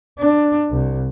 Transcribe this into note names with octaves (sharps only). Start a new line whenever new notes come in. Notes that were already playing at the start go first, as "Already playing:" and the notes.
D4
C2